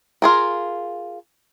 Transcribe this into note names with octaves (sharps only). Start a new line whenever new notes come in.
F4 G#4 A#4